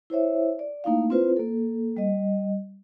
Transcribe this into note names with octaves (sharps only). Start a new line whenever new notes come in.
E4 C5 C#5 E5
D5
A3 A#3 D#4 E4 F5
C4 E4 F4 B4 C5
A#3 A4
G3 D#5